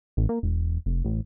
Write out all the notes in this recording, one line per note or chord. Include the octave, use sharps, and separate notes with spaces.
A1
A#3
E1
F1
A1